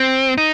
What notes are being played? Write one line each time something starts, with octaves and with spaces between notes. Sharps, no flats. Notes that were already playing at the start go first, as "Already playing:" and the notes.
Already playing: C4
D#4